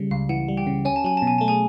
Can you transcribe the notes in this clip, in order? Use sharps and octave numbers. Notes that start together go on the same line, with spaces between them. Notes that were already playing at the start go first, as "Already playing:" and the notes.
Already playing: C#3 G3
C#2 F5
E3 F#5
G3
G4 G5
C#3
C#4 G#5
A5
F#3 G#5
B2 A5
G#5
A3 A5
G#4 G#5